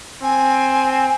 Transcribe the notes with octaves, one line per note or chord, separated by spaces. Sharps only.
C4 G#5